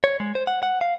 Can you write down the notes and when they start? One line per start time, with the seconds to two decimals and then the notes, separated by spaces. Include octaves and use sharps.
0.04 C#5
0.20 G#3
0.35 C5
0.47 F#5
0.63 F#5
0.81 F5